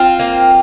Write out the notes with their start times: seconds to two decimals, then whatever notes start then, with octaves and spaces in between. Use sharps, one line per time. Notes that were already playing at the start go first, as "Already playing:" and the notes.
Already playing: C4 F4
0.19 A#3